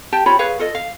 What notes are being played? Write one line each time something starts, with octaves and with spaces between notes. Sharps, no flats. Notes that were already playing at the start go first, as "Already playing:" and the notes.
G4 G5 A5
F4 G4 C#5 B5
G#4 B4 C#5 F5
F4 A4 D#5
F5